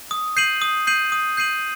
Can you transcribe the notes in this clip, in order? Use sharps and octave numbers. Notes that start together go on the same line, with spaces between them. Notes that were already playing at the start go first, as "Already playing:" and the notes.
D#6
G6 C7 D#7 F#7
D#6
G6 C7 D#7 F#7
D#6
G6 C7 D#7 F#7